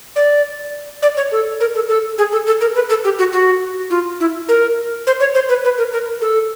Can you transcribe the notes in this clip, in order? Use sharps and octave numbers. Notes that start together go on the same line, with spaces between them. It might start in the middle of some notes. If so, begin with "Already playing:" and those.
D5
D5
C#5
A4
A#4
A4
A4
G#4
A4
A4
A#4
B4
A4
G4
F#4
F#4
F4
E4
A#4
C5
C#5
C5
B4
B4
A#4
A#4
A4